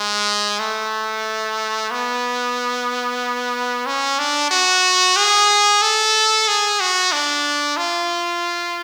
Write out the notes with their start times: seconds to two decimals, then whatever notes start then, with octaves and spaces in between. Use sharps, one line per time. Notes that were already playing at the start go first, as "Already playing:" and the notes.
Already playing: G#3
0.60 A3
1.91 B3
3.86 C#4
4.19 D4
4.51 F#4
5.16 G#4
5.82 A4
6.48 G#4
6.81 F#4
7.12 D4
7.77 F4